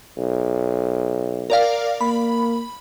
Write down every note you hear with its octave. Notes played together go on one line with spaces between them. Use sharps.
B1
A#4 D5 F5
A#3 B5